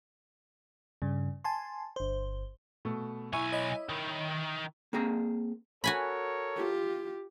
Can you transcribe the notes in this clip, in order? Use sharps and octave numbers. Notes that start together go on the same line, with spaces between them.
G2 C#3
G#5 A5 C6
G1 C5
B2 A3
B1 E4 G#5 C#6
C#5 D#5 B5
D#3
A#3 C4 G#4 A#5
F#4 A4 A#4 C#5 G#5 B5
F4 G4